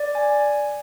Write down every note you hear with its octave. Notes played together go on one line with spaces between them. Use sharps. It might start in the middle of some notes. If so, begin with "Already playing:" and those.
Already playing: D5
G#5